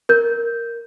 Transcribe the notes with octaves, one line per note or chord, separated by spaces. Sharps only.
A#4 G6